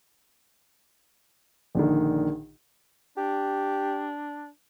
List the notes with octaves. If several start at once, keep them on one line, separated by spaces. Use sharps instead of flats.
A#1 D3 D#3
D4 G4